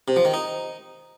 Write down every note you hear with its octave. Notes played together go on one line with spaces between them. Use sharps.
C3
F3
D#3
D#4